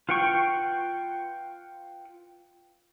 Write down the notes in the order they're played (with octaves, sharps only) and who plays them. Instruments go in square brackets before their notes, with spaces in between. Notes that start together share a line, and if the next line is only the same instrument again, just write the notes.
[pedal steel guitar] F4 B4 F#5 G5 C#6